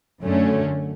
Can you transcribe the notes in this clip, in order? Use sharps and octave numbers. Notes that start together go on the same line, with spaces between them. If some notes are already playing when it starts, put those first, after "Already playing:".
F#2 D3 A3 C#4